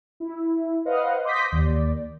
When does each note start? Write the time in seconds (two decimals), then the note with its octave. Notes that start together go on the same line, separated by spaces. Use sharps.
0.20 E4
0.85 B4 C5 D#5 F5 F#5
1.24 C6 D6 D#6 G6 A#6 B6
1.52 D#2 D5